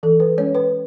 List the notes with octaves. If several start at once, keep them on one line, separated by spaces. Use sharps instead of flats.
E3 A4
B4
G#3 C#4 C#5
B4